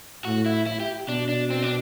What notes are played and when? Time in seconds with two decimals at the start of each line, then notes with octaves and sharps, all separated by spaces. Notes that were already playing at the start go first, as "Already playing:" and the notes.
0.25 A2 F#4
0.46 E4
0.66 E4
0.80 G4
1.08 B2 D4
1.29 D4
1.50 C4
1.62 D4